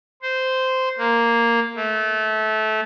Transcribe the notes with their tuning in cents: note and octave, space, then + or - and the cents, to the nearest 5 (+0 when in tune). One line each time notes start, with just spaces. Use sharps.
C5 -10
A#3 -5
A3 -20